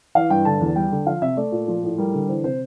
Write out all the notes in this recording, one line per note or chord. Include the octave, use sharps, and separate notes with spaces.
E3 F5
G2 G5
D3 A5
E2
G3 G5
D3
F3 F5
C3 E5
A3 D5
A#2
F3
A2
G3 A#4
D3
E3 C5
C3 C5